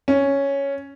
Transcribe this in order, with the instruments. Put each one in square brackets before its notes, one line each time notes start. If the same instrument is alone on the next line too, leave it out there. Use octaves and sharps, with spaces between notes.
[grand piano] C#4